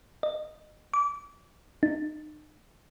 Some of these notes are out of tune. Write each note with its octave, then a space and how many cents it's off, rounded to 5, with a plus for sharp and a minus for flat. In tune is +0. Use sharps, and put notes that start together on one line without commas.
D#5 -30
D6 -30
D#4 -40